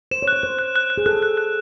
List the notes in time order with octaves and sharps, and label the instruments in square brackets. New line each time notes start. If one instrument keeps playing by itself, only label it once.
[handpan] C5 [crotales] E7
[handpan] C#5
[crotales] F#6
[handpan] C#5
[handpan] C5 [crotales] F#6
[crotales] F#6
F#6
F#6
[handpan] G#4
[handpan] A4 [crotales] F#6
[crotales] F#6
F#6